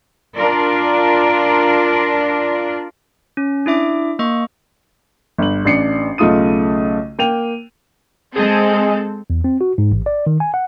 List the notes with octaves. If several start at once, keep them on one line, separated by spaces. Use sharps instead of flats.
D4 F4 A#4 D5
C#4
D4 E4 E5 D6
A#3 D#5 C#6
G1 F#7
A1 D4 C7 C#7
B1 C#3 A3 F4 D#6 D#7
A#3 G5 D#7 F7
G#3 C4 G#4 A4 D#5
E2
C4
F#4
G#2
A1
D5
D#3
G#5
F#5